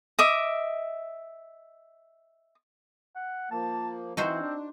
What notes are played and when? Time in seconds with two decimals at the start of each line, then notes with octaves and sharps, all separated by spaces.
0.19 D#5 E5 D6
3.16 F#5
3.51 F3 A#3 A5
4.17 E3 C4 D#4 E4 F#4 C5
4.40 D4